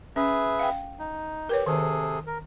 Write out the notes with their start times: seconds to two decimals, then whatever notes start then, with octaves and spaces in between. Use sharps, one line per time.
0.16 C#4 G#4 B4 E5
0.59 F5 G5
0.99 D#4
1.49 G4 A#4 B4 C#5
1.66 C3 D#3 G#4 A4
2.26 A#4